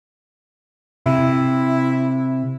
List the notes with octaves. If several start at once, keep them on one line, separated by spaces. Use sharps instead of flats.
C3 E4